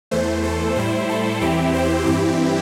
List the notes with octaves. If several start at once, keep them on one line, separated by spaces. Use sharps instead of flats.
E2 E3 A3 C5
A4
A2 G3 E4 C5
A4
E2 E3 C4 E4 G4
C5
G2 E3 C4 E4 G4